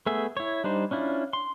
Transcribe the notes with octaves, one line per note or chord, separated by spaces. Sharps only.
A3 B3 G#4 E5
E4 C#5
G3 D4 D#4 C5
C#4 D4 E4 F4
C6